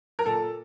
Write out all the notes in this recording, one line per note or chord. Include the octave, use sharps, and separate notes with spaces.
A#4
A#2 A4